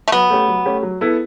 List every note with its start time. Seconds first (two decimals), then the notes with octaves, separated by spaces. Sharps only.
0.08 A3
0.12 F#3 B3
0.30 A3 C#4 G4
0.48 F#3
0.66 A3 C#4 G4
0.83 F#3
1.01 B3 E4 A4